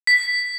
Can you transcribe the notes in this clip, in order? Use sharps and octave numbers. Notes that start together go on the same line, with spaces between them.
B6